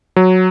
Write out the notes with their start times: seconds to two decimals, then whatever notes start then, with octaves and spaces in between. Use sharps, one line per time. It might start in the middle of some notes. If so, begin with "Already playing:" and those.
0.16 F#3